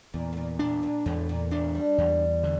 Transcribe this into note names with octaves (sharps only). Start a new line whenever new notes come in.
E2 A#2
A2
A#2
A#2 D4
A#2
E2 A2
A#2
A#2 D4
G3
E2
D3